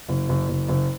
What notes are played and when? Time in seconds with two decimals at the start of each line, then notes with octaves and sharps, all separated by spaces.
0.09 F#1
0.29 F#1
0.48 F#1
0.69 F#1